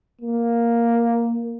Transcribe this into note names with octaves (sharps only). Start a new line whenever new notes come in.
A#3